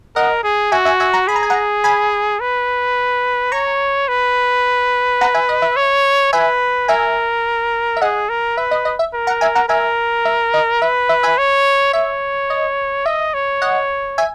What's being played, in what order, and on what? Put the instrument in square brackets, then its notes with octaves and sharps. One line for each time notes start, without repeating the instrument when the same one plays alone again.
[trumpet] A#4 [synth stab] D#5 F#5
[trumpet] G#4
[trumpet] F#4 [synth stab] E5 G#5
[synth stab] E5 G#5
E5 G#5
F#5 A#5
[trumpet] G#4 [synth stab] B5
[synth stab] A#5
G#5
F#5 A#5
G#5 B5
[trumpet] B4
[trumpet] C#5 [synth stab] A#5 C#6
[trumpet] B4
[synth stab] F#5 A#5
E5 G#5
D#5
E5
[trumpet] C#5
[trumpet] B4 [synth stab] E5 G#5
[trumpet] A#4 [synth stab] E5 G#5
[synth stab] E5
[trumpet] G#4 [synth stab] D#5 F#5
[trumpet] A#4
[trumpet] B4 [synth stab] E5
[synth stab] D#5
D#5
E5
[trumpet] A#4
[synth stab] F#5 A#5
E5 G#5
F#5 A#5
[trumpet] A#4 [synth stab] E5 G#5
[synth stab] E5
D#5
[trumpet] B4 [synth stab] E5
[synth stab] E5
E5 G#5
[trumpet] C#5
[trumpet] C#5 [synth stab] E5
[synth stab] D#5
[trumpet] D#5 [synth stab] E5
[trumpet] C#5
[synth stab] D#5 F#5
E5 G#5